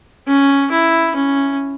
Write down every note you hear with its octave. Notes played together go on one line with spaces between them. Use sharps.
C#4
E4
C#4